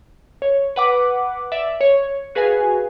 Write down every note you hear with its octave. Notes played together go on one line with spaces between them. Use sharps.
C#5
B4 F#5 D6
D5 E5
C#5
F#4 G#4 B4 F5 G#5